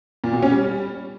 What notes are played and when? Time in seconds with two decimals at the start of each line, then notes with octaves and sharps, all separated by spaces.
0.24 A#2
0.33 B2
0.43 C#4
0.52 G3